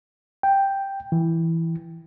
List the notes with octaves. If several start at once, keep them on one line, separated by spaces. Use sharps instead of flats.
G5
E3